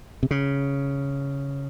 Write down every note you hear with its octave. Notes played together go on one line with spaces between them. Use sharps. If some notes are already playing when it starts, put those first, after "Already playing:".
C3
C#3